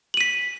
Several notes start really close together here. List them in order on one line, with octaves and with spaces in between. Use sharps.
F#7 D#7 B6